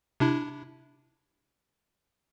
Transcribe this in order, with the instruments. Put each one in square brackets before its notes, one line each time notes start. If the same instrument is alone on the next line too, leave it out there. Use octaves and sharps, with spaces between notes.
[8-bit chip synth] C3 D4 E4